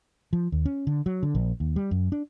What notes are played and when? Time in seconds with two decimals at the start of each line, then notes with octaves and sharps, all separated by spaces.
0.33 F3
0.52 D#2
0.65 C#4
0.87 D3
1.06 F#3
1.23 D3
1.35 A#1
1.60 D#2
1.76 G3
1.91 F#2
2.12 D4